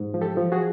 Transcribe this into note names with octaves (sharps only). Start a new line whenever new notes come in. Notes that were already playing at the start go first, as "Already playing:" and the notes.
Already playing: G#2
F3
G4 A4
F3
F#4 G#4